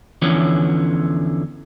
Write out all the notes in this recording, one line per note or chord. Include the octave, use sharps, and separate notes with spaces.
E2 D3 E3 F3 C#4